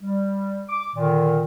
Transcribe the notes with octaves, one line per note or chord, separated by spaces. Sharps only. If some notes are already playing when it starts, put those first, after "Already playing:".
G3
D6
A#2 D3 D#3